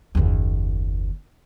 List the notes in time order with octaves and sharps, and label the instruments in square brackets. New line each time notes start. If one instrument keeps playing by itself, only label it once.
[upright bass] F#1 D#2